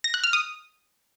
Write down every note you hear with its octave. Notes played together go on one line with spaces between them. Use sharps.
A#6
F#6
F6
D#6